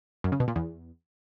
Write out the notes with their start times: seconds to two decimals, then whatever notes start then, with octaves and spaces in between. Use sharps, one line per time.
0.24 F#2
0.32 C#3
0.40 B2
0.48 A#2
0.56 E2